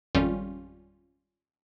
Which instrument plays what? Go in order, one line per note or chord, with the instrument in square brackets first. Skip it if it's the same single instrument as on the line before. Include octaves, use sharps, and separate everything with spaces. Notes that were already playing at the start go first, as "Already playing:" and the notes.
[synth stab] G#1 F2 G3 C#4 F4